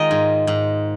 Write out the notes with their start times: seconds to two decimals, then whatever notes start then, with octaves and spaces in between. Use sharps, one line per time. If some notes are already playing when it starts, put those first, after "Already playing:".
Already playing: D#3 G#3 F4 A#4 D#5
0.11 G#2
0.47 G#2